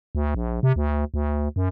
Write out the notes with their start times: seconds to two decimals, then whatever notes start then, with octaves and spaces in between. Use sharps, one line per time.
0.15 D2
0.35 A#1
0.63 C3
0.76 D2
1.14 D2
1.56 F#2